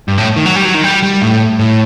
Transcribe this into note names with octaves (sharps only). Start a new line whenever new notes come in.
G2
A2
D#3
F#3
G3
F#3
D#3
G3
G3
A2
A2